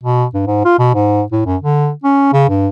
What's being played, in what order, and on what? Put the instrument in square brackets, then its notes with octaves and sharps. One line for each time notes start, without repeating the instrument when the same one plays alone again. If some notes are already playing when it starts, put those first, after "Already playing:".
[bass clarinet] B2
G2
G#2
F4
B2
G#2
A2
F#2
D3
C#4
C#3
G2